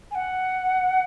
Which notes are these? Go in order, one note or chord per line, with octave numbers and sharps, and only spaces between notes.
G#5
F#5